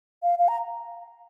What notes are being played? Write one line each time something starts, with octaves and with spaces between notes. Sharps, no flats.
F5
F5
A#5